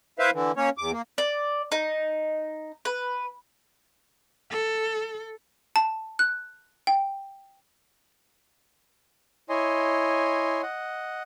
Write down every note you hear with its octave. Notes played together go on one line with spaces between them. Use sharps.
E4 B4 C5 E5 F5
D3 E3
A#3 C#4 C#5
E2 D6
A#3
D5
D#4
B4
A4
A5
F#6
G5
E4 C#5 D#5 G#5 C6
D#5 F#5